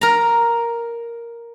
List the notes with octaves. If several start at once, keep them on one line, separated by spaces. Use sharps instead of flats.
A#4 A#5